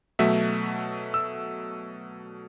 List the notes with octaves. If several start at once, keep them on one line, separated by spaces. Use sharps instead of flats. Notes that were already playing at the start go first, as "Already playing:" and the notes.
B2 F#3 A3 E5
E6